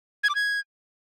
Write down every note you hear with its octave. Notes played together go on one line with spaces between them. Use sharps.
G#6
D6
G#6